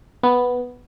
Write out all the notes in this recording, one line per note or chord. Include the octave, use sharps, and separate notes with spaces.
B3